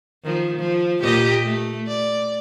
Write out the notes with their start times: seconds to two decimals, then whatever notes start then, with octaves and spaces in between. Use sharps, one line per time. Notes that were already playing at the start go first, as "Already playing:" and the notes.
0.24 D#3 F3
0.58 F3
1.02 A#2 G4 D#5
1.45 A3
1.87 D5